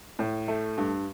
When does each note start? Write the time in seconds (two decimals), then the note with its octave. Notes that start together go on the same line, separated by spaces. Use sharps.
0.19 A2
0.48 A3
0.77 G2